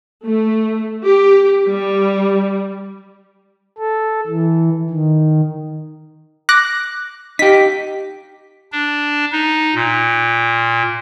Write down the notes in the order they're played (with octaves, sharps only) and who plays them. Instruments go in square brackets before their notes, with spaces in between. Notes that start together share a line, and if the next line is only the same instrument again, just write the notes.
[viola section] A3
G4
G3
[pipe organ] A4
E3
D#3
[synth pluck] D6 F#6 A#6
[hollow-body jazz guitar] D#4 G4 [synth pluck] B6
[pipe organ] D4
D#4
A#2